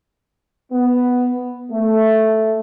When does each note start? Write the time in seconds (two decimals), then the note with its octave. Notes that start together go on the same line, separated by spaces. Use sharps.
0.72 B3
1.72 A3